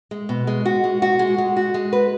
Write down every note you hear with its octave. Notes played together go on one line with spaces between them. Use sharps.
G#3
B2
G#3
F#4
G#3
F#4
G#3
G#3
F#4
G#3
B4